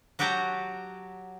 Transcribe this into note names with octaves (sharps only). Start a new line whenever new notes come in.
F#3 F#4 G4 G5 A5 A#5